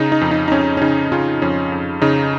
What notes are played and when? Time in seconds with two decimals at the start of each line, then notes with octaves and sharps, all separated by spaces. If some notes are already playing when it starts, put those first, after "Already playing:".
Already playing: C#3 D#4
0.12 D#4
0.21 F2
0.31 D#4
0.48 D#4
0.52 F2 C#4
0.77 C#4
0.81 C#3 D#4
1.12 C#3 C#4 F4
1.42 F2 C#4
1.72 F2
2.02 C#3 D#4